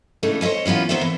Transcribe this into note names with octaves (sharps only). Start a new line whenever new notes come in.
C#3 E3 G#3 A3 D#4
C5 C#5 D#5 E5 G#5
F#2 E3 B3 C#4 F4
B3 D#4 C5 C#5 E5
E3